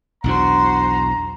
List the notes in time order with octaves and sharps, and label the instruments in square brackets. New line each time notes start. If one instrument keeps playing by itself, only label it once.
[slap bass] B1 E2 D4 [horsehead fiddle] F#4 C5 [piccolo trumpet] A#5